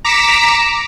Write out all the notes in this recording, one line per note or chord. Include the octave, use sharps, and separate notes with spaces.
A#5 D6 B6 C#7 E7